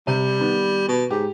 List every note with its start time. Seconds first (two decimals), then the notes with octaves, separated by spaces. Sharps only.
0.07 C3 G3
0.39 D#3 B3
0.88 B2
1.10 G#2 G4